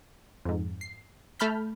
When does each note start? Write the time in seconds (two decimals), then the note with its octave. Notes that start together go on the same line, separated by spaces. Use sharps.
0.45 F2 G#2
0.81 C7
1.40 A3 A5 B5 F6 G6 B6